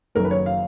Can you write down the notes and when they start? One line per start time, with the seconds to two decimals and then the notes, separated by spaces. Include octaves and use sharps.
0.15 F#1 F#2 D#3 F#3 A#4
0.25 B4
0.31 C#5
0.46 F5